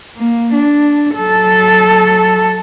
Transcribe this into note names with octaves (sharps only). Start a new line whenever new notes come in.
A#3
D4
F#3 A4